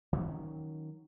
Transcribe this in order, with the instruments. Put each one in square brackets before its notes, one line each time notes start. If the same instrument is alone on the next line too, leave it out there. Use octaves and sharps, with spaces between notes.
[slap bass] D#3 F#3 A#3 C#4